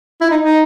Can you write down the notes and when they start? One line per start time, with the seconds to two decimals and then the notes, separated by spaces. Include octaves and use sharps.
0.21 E4
0.31 D#4
0.41 D#4